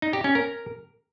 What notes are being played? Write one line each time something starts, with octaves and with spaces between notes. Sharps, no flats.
D#4
G4
C#4
A#4